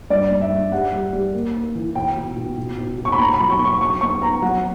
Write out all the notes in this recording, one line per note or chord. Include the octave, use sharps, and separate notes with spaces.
G2 D5
G2
E5
G2
G3 F#5
G3
G3
A#3
A#3
E3
B2 G5
B2
B2
B2
B2
B2
C#6
B5
B2 A#5
B5
F#3
C#6
B3 C#6
F#3 C#6
B3 C#6
B3 A#5
F#3 F#5